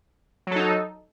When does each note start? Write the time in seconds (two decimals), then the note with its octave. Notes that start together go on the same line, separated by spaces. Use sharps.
0.47 F#3
0.51 A4
0.56 D#4